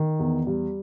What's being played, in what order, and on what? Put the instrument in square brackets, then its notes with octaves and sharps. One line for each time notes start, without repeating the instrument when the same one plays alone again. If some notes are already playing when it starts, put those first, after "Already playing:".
Already playing: [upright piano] D#3
E2
G3